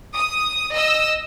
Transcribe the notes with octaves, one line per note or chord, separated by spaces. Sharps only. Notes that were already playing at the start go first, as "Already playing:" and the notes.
D#6
D#5 E6